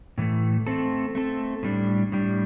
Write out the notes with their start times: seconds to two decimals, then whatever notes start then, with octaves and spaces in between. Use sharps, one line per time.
0.18 A2 E3 A3
0.67 A3 C4 A4
1.15 A3 C4 A4
1.63 A2 G3 D4
2.12 A2 G3 D4